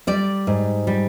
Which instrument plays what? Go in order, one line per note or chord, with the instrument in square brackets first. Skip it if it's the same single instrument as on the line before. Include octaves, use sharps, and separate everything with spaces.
[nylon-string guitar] G3 D5
G#2
G3